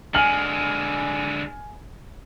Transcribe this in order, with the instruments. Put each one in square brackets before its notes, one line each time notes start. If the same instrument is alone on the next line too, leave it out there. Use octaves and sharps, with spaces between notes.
[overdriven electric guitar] D3 G#3 [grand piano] G#5 F6 F#7